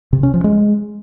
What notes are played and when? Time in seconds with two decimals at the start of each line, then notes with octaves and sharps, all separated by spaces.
0.13 C3
0.23 C#4
0.34 F3
0.44 G#3